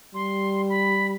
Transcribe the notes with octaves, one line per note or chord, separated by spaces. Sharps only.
G3 C6
B5